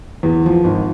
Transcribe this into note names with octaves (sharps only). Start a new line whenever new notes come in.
E2
F3
G#1